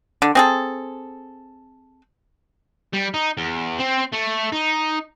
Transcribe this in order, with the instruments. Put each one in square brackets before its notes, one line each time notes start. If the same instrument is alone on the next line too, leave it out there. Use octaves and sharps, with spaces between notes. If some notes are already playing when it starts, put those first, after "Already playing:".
[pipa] D3
C4 G#4 A4
[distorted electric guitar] G3
D#4
E2
C4
A3
D#4